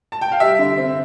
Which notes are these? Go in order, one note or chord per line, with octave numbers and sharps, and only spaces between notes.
A5
G5
F5
G3 E5
D3
C4